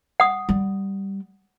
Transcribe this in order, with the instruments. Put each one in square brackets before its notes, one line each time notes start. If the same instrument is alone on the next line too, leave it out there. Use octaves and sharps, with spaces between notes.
[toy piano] F#5 D#6
[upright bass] G3